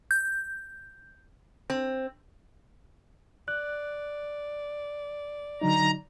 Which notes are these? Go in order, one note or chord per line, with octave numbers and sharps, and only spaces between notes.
G6
C4
D5 F#6
D3 F#3 D#4 A#5